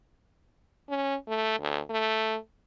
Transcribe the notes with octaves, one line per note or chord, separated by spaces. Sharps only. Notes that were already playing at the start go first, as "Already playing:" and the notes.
C#4
A3
D2
A3